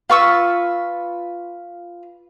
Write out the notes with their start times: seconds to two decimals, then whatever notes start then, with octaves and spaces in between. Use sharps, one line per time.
0.10 F4 B4 C#6 E6